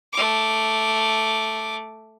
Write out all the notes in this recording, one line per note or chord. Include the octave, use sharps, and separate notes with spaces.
A3 D6